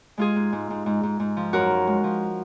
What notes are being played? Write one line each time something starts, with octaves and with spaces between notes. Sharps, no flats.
G#3 F4 G#4
G#2
G#2
G#2
G#2
G#2
G#2
F3
F#2 F#4 A#4
F3
G#3
F3